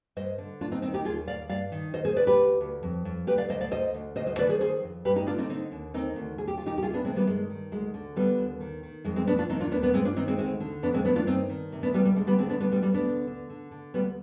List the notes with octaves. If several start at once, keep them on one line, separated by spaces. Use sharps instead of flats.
G2 C5 D#5
D3
D2 D4 F4
C4 D#4
D#3 C4 D#4
D#4 G4
D#2 F4 G#4
D#2 D5 F5
G2 D5 F5
D#3
D#3 C5 D#5
G#4 C5
D#3 B4 D5
G4 B4
D2
D2
F2
F2
D2 G4 B4
D5 F5
D2 C5 D#5
D5 F5
D2 C5 D#5
D2
D2 C5 D#5
C5 D#5
D#3 B4 D5
G#4 C5
D#3 G#4 C5
F2
G2 G4 B4
D#4 G4
D3 D4 F4
C4 D#4
D3 C4 D#4
D#2
D#3 C4 D#4
D2
D#2 G#4
G4
D#2 F4
D#4 G4
G4
C3 F4 G#4
B3 D4
D#3 G#3 C4
G3 B3
G2 G#3
D#3
D2 G#3
D3
D3 G3 B3
D#2
D#3
D#3
F2 G#3
G#3 C4
F2 B3 D4
D4 F4
D#3 C4 D#4
D4 F4
D#2 B3 D4
B3 D4
G2 G#3 C4
D4 F4
D#3 C4 D#4
G#3 C4
D2 G#3 C4
D3
F2 B3 D4
G#3 C4
D#3 B3 D4
D4 F4
G2 C4 D#4
D#3
C3
B3 D4
D2 G3 B3
G3
D3 G#3
G3 B3
D3 G#3 C4
B3 D4
D2 G3 B3
G3 B3
D2 G3 B3
B3 D4
D3
D3
D3
D3
D2 G3 B3